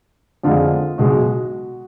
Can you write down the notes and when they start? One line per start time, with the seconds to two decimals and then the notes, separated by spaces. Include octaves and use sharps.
0.43 F2 D3 G#3 F4
0.98 B1 B2 G#3 F#4